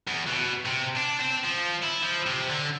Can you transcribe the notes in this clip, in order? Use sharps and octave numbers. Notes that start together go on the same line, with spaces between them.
E2
B2
C3
D4
C4
F3
E4
F3
C3
D3